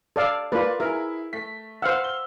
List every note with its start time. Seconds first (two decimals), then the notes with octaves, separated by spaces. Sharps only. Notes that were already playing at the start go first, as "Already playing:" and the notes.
0.16 A4 D5 F5
0.52 A#3 F4 B4 D5
0.80 E4 G#4 A#4
1.33 A3 B6
1.82 C5 F5 F#5 E6 F6
2.04 G7